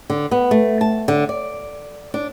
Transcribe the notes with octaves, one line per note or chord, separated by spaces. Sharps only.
D3
B3
A3
A5
D3
D5
D4